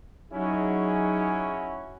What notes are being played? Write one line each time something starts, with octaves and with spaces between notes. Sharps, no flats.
F#3 C#4 D#4 E4 F#4 G#4